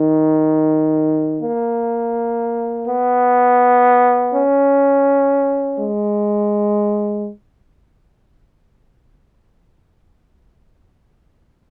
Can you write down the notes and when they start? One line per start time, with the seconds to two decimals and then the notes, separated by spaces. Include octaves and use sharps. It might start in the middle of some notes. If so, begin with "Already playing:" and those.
Already playing: D#3
1.40 A#3
2.85 B3
4.32 C#4
5.77 G#3